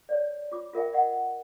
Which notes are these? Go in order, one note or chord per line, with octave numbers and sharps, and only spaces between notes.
C#5 D5
F4 D6
F4 A#4 E5 G5
D#5 F#5